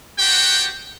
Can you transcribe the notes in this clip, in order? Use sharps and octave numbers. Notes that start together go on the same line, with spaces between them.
B3 F#4 G4 C5 F#5 G5